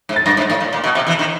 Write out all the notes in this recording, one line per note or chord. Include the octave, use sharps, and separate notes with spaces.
G#2
A6
G2 A#6
G#2
A2
A#2
A#2
B2
C3
E2 E3
D#3